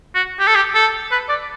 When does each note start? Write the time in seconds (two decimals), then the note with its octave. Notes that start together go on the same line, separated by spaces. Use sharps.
0.15 F#4
0.40 G4
0.47 A4
0.55 G4
0.75 A4
1.11 B4
1.29 D5